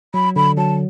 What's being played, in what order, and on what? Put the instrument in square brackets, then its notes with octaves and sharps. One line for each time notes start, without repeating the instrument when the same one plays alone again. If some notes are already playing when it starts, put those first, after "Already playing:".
[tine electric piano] F#3 [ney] B5
[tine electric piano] D3 [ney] B5
[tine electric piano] F#3 [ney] A5